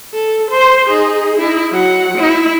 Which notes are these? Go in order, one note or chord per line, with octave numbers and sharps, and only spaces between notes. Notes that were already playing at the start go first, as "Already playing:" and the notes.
A4
C5 C6
D#4 G#4
D#4 E4
F#3 F#5
E4